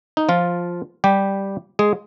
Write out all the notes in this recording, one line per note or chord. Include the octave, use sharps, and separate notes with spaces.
D#4
F3 F4
G3 G4
G#3 G#4